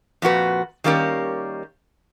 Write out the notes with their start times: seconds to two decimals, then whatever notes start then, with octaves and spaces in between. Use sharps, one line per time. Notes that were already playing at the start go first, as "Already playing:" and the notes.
0.22 F2 A#2 F#4 B4
0.84 D#3 G3 A#3 C#4 G4